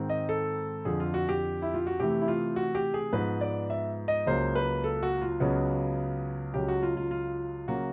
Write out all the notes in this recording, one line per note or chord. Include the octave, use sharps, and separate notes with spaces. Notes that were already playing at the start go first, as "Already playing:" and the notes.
Already playing: G#2 D#3 G#3 C4
D#5
A4
F2 D3 F3 G#4
F4
F#4
G4
E4
F4
F#4
C3 E3 A3 G4
E4
F4
F#4
G4
G#4
G#2 F3 G#3 B3 B4
D5
E5
D#5
C#2 C#3 F#3 A#3 C5
B4
A4
F#4
F4
C#2 C#3 F#3 B3 F#4
C#2 C#3 F#3 G4
F#4
F4
F4
F4
C#3 F#3 A#3 F#4